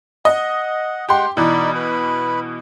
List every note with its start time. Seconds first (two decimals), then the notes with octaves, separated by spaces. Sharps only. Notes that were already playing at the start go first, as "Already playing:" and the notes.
0.25 D#5 F#5
1.09 G#3 G4 F#5 G5 C6
1.37 B2 E3 D#4 D5 B5
1.75 B4 B5